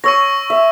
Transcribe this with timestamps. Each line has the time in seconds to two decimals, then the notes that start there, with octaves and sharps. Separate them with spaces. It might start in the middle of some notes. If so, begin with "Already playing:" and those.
0.04 C#5 C#6 E6 A#6
0.50 E5